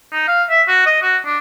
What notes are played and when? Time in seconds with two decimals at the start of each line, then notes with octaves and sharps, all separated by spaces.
0.12 D#4
0.28 F5
0.50 E5
0.68 F#4
0.86 D#5
1.02 F#4
1.26 D4